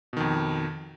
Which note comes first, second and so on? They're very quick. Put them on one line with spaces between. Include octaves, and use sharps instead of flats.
B2 D#3 F2